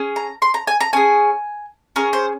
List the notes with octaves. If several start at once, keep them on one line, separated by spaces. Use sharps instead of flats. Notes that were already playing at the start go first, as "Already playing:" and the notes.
Already playing: C#4 G#4
A#5
C6
A#5
G#5
A#5
C#4 G#4 G#5
C#4 G#4 A#4
C5